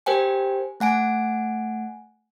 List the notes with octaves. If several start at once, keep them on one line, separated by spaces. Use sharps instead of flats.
G4 A#4 C5 G5 G#5
A3 F#5 G#5 D7